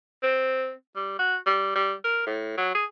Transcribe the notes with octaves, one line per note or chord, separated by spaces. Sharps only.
C4
G3
F#4
G3
G3
A#4
A2
F#3
G#4